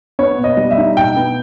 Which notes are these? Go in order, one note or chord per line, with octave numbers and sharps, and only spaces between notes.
B3 C#5
B2
D#5
G3
E5
D#4
B2 G5
B3